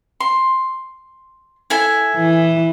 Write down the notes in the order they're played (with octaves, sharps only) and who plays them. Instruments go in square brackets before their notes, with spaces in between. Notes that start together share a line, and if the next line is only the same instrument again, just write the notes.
[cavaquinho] C6
E4 A4 G#5
[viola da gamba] E3